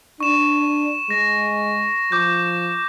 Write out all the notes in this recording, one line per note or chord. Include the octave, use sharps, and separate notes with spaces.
D4 C#6 E7
G#3 A#6
F3 D6 G6